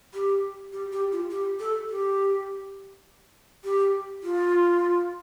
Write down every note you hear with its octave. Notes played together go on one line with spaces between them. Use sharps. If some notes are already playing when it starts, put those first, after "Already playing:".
G4
G4
G4
F4
G4
A4
G4
G4
F4